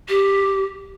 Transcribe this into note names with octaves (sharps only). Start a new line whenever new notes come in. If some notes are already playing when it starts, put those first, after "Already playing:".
G4